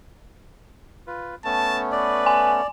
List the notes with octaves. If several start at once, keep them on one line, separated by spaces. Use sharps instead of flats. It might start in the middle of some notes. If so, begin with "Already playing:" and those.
F4 B4
A3 B3 C#4 A5
B4 D5
G#5